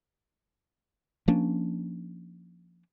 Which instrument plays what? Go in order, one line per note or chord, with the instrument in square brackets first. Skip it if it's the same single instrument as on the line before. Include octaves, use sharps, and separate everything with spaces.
[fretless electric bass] F3 A#3 C#4 D4